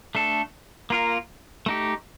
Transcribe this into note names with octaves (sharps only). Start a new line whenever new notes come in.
A3 D4 A4
A#3 F4 A#4
A3 D#4 G4